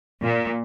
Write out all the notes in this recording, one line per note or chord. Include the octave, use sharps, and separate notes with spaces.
A#2